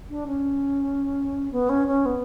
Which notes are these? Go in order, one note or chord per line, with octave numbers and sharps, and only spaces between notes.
D4
C#4
B3
C#4
C#4
B3